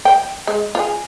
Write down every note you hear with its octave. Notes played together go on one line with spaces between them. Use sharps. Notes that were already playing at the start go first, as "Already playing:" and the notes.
G5
G#3
F4 G#4